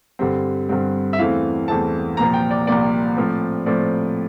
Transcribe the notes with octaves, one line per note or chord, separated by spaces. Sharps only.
G2 D3 G3 C4
G2 D3 G3 C4
E5
E2 E3 A3 C4 F5
E2 E3 A3 C4 A5
C2 A#2 F3 A#5
G5
D5
C2 A#2 F3 D5
A2 F3 C4
A2 F3 C4 D5